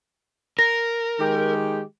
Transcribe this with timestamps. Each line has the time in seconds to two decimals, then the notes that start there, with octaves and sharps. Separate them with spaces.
0.59 A#4 A#6
1.20 D#3 G#3 G4